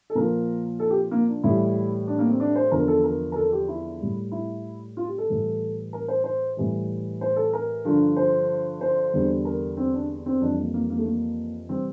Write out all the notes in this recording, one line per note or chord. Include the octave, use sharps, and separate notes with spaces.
A4
A#2 F3 A#4
A4
G4
A#3
D4
A2 E3 G3 E4
D4
A#3
C4
D4
C5
E2 D3 F3 A#4
A4
A#4
A#4
A4
G4
E4
A2 G3
E4
F4
G4
A4
A2 E3 G3
A#4
C5
C5
A2 E3 G3
C5
A4
A#4
G2 D3 F3
C5
C5
E2 D3 G3
A#4
C4
D4
C4
F2 E3 G3 D4
A#3
A#3
A#3
A3
A#3
C3 E3 G3 C4